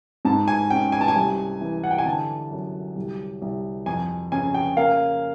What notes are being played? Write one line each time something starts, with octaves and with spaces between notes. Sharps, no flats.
G#2 A5
G#5
C#4 G5
G#5
A5
G#5
C2
E3
F#5
G5
G#5
D3 A5
F#2
C2
C2
F2 G#5
C#3 G#5
G5
A#3 F5